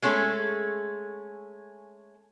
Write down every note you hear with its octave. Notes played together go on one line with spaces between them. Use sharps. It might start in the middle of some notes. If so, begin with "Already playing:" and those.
G#3 A3 C#4 F#4 G#4 A4